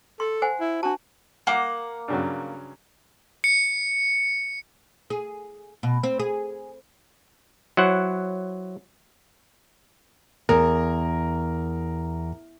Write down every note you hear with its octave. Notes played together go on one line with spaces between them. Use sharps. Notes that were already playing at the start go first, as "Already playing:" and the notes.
A4 C6
C5 F#5 G#5
E4
D4 F#4 A5
A#3 F5 F#5 D6
G2 C#3 F#3
C#7
G#4
B2
C4
G#4
F#3 E4 C5 F#5
E2 A#4